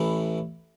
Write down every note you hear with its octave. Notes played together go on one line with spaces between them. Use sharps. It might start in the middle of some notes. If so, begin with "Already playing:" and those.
Already playing: A1 A2 E3